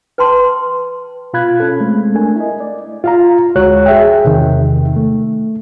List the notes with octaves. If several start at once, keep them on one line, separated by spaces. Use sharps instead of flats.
B4 G5 A5 C6
B2 F4 F5 B5 F#6 G#6
C#4 A4
G#3 A3 C4
A3 D4 A#4 G#5
E4 D#5
D5
F4 F5 A#5
D2 G#3 F#4 C#5 F#6
G#4 E5 G5
E2 C3 D#3
A3